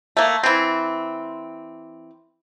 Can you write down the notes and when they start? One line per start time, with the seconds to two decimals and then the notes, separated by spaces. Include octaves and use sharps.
0.17 A3 A#3
0.43 E3 C4